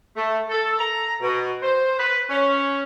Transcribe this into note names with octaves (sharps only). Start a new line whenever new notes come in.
A3
A4
A#5
B2
C5
B4
C#4